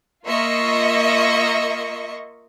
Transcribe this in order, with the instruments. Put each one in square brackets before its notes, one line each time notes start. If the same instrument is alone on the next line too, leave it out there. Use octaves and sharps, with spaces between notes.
[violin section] A#3 F4 D#5 E5 C#6